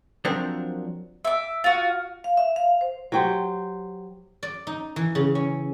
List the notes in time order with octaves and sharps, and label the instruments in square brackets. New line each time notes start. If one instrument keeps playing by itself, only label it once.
[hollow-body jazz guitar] F3 F#3 C4 D4 A#4
[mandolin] E5 D6
F4 F#4
[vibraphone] F5
E5
F5
C5
[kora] F#3 G4 C5
[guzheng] D5
D#4
E3
C#3
C#4